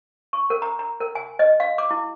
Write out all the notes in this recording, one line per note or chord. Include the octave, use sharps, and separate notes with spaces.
C#6
A#4
A#5
A#5
A#4
G#5
D#5
F5
D6
E4